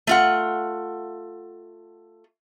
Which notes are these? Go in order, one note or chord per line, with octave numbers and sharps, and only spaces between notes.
A3 F4 F#5